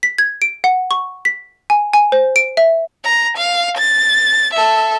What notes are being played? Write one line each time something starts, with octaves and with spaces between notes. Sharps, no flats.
B6
G#6
D7
F#5
C#6
B6
G#5
G#5
C5
D7
E5
A#5
F5
A6
A4 E5